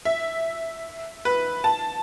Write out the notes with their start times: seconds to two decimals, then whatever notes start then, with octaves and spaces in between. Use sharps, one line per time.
0.05 E5
1.25 B4
1.64 A5